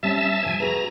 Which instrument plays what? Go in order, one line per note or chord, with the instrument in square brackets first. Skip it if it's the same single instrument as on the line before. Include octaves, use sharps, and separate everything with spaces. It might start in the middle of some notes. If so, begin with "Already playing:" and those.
[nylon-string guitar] G3 C4 C#4 [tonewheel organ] E5 A5
[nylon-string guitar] F2 C3 F3 [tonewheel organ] G#5
[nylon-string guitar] F#4 G#4 B4 [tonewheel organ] A#5